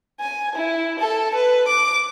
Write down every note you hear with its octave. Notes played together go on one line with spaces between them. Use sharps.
G#5
E4
A4
B4
D6